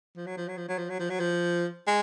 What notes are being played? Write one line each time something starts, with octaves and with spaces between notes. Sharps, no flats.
F3
F#3
F3
F#3
F3
F#3
F3
F#3
F3
F#3
F3
G#3